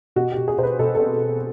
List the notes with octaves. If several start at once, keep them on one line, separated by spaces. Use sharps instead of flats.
B2 F#4
G4
B2
G#4
B2 C5
B4
B2 A4
A4
C4